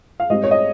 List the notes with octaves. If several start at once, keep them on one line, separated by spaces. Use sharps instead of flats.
F5
G#2 G3 C4 D#5
C#5
D#5